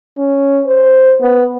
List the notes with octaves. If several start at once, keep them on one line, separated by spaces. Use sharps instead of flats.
C#4
C5
B3